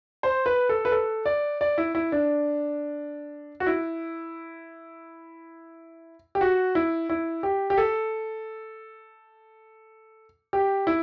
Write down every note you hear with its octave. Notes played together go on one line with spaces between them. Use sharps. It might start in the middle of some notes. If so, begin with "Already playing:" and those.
C5
B4
A4
B4
A4
D5
D5
E4
E4
D4
F#4
E4
G4
F#4
E4
E4
G4
G4
A4
G4
E4